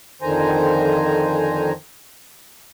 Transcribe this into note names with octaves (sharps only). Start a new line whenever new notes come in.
F2 D3 D#3 C5 G#5 A#5